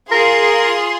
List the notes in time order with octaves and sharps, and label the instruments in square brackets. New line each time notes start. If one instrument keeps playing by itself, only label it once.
[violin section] F4 G#4 C6 [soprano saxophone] A#4